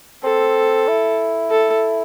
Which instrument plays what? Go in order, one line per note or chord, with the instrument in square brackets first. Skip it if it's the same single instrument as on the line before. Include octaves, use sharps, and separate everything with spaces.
[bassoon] C4 [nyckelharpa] A4
[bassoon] E4
[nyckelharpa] A4